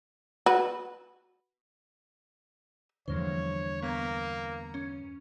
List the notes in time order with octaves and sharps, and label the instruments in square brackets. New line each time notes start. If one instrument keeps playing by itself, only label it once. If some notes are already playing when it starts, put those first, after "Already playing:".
[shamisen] F#4 B4
[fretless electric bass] E2 G2 D3 [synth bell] F3 A#3 C5 [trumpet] C#5
[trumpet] A#3 [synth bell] B3 A#5
[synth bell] C#4